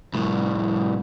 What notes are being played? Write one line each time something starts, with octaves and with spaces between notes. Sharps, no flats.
C2 A2